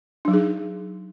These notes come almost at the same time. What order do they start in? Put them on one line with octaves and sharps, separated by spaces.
D4 F#3 D#4 G#4